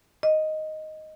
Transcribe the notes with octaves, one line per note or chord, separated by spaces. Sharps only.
D#5